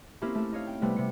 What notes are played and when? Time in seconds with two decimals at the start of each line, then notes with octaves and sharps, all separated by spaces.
0.22 A#3 C4 C#4 E4 G4
0.35 A3 A4
0.52 D#4 C#5 F5
0.67 G5
0.82 C3 G3 A3 B3 C4
0.96 C3 C#7